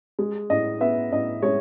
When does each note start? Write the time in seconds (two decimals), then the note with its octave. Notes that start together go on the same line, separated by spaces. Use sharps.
0.19 G#3
0.50 A2 D#5
0.80 B3 E5
1.11 A2 D#5
1.42 G#3 C#5